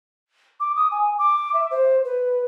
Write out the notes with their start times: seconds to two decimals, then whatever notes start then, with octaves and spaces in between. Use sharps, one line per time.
0.60 D6
0.76 D#6
0.91 G#5
1.18 D6
1.53 E5
1.71 C5
2.05 B4